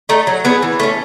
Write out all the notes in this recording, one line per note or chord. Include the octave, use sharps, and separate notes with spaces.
A3 D#4
F#3
B3 E4 G#4
E3
A3 C#4